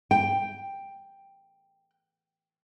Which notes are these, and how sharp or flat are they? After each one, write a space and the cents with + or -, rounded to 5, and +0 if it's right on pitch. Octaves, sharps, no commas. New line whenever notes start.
G5 +5